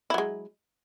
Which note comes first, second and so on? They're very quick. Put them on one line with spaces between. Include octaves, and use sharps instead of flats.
E4 F#3 G#3